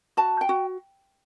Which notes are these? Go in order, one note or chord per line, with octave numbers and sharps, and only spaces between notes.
F#4 A5
G5
F#4